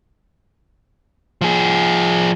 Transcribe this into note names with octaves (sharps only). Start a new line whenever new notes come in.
F3 G#4